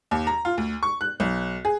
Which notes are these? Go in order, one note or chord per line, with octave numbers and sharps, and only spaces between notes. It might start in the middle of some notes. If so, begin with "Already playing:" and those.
D#2
A#5
F4
D2
C#6
F#6
B1
G#4